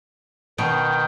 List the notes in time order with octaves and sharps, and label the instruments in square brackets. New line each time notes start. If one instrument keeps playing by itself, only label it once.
[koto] B2 [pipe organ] D#3 G5